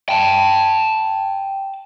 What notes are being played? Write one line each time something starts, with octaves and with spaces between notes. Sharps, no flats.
G5 A5